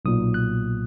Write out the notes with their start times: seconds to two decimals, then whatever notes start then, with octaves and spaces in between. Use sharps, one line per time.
0.05 B1 A#2 D#6
0.34 F#6